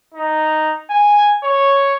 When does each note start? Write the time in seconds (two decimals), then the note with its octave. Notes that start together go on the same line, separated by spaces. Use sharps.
0.14 D#4
0.90 G#5
1.44 C#5